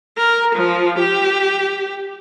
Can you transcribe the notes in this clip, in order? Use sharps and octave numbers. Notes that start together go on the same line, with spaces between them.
A#4
F3
G4